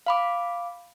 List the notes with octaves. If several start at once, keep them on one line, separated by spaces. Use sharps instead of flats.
F5 B5 D6